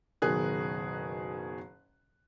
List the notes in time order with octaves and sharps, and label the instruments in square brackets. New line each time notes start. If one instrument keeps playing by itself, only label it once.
[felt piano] F#1 B2 D#3 G#4 F#6